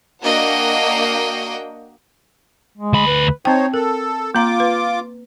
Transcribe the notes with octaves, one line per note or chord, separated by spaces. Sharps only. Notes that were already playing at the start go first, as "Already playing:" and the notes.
A#3 D4 F#4 D#5 F#5 G5
G#3
D2 B5
B4
C4 D#4 C5 C#5 G5
A4 A#4
A#3 F4 A#5 D6
B4